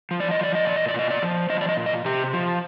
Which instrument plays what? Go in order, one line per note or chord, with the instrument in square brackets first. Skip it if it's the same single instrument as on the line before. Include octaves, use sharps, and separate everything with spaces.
[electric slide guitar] F3
D5
D#5
F3 D5
D#5
A#2 D5
D#5
D5
A#2 D#5
D5
F3
F3 D#5
D5
D#5
A#2
D#5
C3 G4
F3